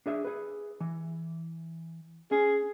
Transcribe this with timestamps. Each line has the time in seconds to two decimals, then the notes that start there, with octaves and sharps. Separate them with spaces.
0.06 D4 G#4 E5
0.25 G#4 B4
0.80 E3
2.31 C#4 G#4